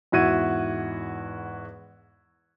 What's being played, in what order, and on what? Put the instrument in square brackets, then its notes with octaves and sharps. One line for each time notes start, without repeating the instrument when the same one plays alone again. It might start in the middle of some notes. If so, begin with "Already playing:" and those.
[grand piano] E2 G#2 E4 F#4 G#6 D#7